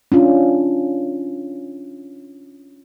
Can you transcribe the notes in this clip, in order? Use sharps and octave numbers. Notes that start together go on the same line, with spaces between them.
C#4 D4 F4